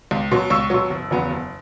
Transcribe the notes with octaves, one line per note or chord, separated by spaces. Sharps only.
C#2
B2 F#3
C#2 C#6 E6
B2 F#3
F#1
E2 C#3 F#3 B3
F#1